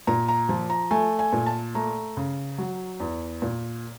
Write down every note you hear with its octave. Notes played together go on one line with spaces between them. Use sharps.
A#2 A#5
A#5
F3
A#5
A3 G#5
G#5
A#2
A5
A3 A#5
C#3
F#3
E2
A#2